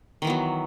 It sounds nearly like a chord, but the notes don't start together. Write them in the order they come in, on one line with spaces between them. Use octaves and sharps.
D#3 E3 B3 F#3